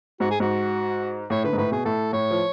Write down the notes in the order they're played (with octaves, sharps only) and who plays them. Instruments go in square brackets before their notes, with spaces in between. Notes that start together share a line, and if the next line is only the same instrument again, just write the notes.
[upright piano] G#2 [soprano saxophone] F#4
[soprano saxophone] G#4
[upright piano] G#2 [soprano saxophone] F#4
[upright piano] A2 [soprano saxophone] C#5
[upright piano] D3 [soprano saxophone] B4
[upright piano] G#2
[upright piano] A2 [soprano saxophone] B4
[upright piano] B2 [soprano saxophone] G#4
[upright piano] A2 [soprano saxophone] A4
[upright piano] A2 [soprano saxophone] C#5
[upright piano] F3